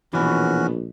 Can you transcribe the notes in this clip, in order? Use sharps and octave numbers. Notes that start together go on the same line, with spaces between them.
A#1 B2 E3 B3 C#4 F#4 B5